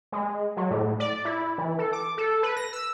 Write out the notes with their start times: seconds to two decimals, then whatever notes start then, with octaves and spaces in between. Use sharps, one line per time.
0.12 G#3
0.57 F#3
0.70 A2
1.00 D5
1.25 E4
1.58 E3
1.79 A4
1.93 D6
2.18 A4
2.43 B4
2.57 A#6
2.73 E6